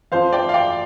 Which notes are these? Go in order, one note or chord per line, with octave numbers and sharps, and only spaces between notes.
F2 F3 C5 F5
D5 G5
F5
D5 G5